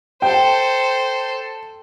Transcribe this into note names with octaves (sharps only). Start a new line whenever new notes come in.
A4 C5 G5